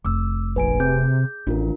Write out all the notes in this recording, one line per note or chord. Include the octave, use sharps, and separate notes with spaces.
F1 D6 E6
A#1 B4 G#5 D7
C3 G#4 D6 G6
A1 D#3 D4 F4 A#4